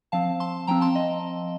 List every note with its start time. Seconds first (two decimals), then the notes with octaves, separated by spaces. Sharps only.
0.12 F3 C4 F5 A5
0.40 A5 C6
0.67 F3 C4 G5 A#5
0.81 A5 C6
0.95 D#5